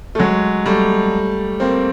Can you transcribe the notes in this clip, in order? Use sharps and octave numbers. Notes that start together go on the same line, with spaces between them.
A3
F#3 G#3
G3 A3
A#3 C4